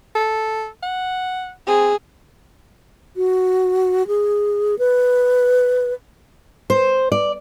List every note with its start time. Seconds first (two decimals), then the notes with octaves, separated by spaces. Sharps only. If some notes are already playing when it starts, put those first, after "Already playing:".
0.15 A4
0.83 F#5
1.67 C4 G#4
3.16 F#4
4.07 G#4
4.79 B4
6.70 C5
7.12 D5